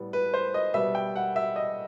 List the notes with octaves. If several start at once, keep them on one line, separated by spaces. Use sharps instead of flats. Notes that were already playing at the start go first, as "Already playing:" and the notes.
Already playing: A2 G3 B3
B4
C5
D#5
B2 G3 B3 E5
G5
F#5
E5
D#5